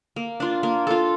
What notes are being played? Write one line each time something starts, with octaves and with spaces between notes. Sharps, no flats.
A#3
D4 F4
A#3
F4 A4